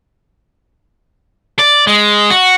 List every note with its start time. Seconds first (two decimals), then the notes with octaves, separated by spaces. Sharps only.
1.59 D5
1.87 G#3
2.30 F#4